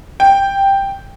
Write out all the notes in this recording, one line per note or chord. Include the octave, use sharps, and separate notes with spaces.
G5